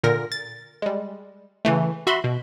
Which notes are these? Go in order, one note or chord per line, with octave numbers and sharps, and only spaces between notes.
A#2 D3 A#4 A#6
A6
G3 G#3
C#3 E3 A3
F#4 E5 B5 C6
B2